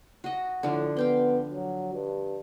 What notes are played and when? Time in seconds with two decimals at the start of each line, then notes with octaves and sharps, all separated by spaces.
0.24 F#4 D#5
0.63 A2 D3 F3 D4
0.97 B3 F5 G5 C6
1.53 F#3
1.94 G2